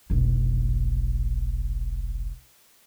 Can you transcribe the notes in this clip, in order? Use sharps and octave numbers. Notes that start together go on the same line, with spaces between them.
F1 B1